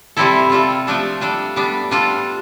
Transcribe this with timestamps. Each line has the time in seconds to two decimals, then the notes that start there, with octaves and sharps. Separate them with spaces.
0.17 C3 G3 C4 E4 A4
0.49 G3 C4 F4 A4
0.87 F3 A3 D4 A4
1.21 G3 D4 A4
1.56 G3 B3 D4
1.91 G3 D4 F4 A4